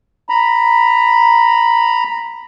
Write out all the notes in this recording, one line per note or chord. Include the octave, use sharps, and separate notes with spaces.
A#5 B5